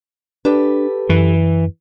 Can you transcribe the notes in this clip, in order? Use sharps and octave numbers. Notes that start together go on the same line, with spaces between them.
D4 G4 A4 B4
F#2 E3